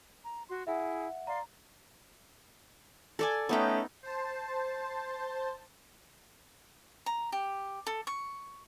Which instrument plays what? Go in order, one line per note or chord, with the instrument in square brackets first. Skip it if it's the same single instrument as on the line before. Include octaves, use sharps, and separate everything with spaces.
[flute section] A#5
F#4 C6
[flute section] E4 G#4 [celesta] E5 F#5
[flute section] D5 F5 C6 [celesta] A#5
[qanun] A4 D5 G#5
[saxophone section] A3 C#4 [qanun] B3 D#4 G5
[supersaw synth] C5 A5
[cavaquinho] A#5
G4
A4
C#6